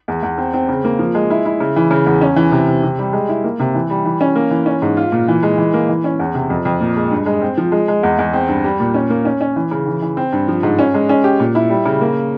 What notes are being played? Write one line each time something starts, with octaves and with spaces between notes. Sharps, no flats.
E2
E2
C4
C4
C#3
A#3
F3
G#3
E4
E4
C#3
E3
C#3
E2
C#4
E3
C3
C3
C3
G3
G#3
E4
A#3
C3
E3
G3
E3
C#4
A#3
E3
C#4
G#2
F4
A#2
E3
G#3
E3
A#3
E3
C#4
E2
C3
F2
F2
A#2
G#3
G2
G#3
C4
F3
G#3
G#3
E2
E2
C4
G2
G3
A#2
C#4
A#3
C#4
C#4
E3
C#3
E3
E3
C4
G2
F3
G#2
C#4
G#3
C#4
G4
A#2
E4
G3
C#3
A#3